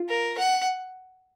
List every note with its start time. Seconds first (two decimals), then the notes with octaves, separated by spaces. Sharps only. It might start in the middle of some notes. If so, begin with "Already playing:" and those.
Already playing: F4
0.09 A#4
0.38 F#5